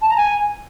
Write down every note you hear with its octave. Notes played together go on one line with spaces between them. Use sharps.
A5
A#5
G#5